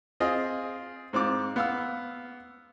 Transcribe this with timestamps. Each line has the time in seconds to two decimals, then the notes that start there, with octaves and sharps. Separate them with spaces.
0.20 C4 F4 G#4 D#5
1.13 G#2 C4 F4 D6
1.56 B3 F5 E6